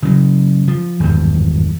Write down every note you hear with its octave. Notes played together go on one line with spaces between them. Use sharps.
C#3 F#3
F3
G#1 E2 G2